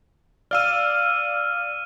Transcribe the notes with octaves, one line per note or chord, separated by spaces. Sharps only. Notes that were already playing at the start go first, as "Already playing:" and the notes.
D5 F5 E6 F6 D#7